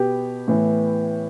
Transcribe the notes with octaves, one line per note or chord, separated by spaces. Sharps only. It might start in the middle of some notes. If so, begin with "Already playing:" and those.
Already playing: B2 B3 G4
A2 E3 B3